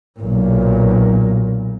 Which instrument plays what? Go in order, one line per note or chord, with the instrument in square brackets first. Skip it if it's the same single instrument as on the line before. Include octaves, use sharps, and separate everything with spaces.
[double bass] B1 A#2